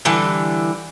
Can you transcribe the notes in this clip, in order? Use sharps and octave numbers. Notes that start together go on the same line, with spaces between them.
D3 E3 G3 A4